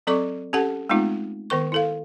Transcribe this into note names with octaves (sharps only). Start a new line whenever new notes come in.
F#3 C4 A4 D5 C#6 D6
C#4 G4 A4 F#5 A5
G#3 A3 B3 C4 D#4 F4
D#3 B3 A#4 C#6
E4 A4 F5